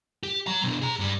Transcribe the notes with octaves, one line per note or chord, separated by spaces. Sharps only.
G4
F#3 A#5
B2 D4
G#4 A#5
G2 G3